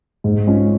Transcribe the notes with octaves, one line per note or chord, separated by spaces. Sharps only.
G#2
G#3 C#4 F4